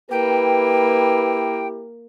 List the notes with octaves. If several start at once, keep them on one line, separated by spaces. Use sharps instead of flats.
A#3 E4 G4 B4 G5